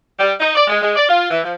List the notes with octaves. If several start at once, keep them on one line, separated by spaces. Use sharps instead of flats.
G3
D#4
D5
G#3
G#3
D5
F4
E3
F3